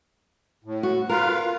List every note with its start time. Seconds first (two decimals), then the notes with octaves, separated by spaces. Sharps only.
0.65 A2
0.83 F#4
1.09 F4 A#4 B4 F5